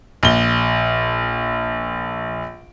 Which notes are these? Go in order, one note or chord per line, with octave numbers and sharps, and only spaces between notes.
A#1 G7